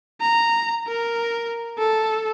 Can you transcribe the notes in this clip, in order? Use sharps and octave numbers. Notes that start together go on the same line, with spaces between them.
A#5
A#4
A4